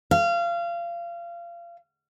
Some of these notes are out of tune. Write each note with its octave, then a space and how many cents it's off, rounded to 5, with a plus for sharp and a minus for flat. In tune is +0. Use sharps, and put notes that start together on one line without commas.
F5 -25